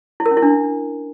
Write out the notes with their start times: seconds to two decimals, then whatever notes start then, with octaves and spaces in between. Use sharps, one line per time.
0.20 E4
0.26 A#4
0.31 C#4
0.37 E4
0.43 D4